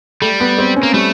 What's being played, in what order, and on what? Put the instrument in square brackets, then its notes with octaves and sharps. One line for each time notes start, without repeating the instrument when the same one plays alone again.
[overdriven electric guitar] G3 [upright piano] A3
[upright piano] B3
C4
C#4
[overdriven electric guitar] A#3
[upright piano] G3 [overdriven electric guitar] A3